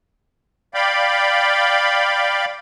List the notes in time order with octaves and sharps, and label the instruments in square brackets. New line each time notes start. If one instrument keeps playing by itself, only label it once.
[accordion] D5 F5 G5 B5